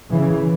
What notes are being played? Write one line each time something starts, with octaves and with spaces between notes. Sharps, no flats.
C#3 E3